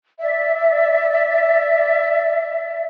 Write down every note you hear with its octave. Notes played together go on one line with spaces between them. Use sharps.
D5 E5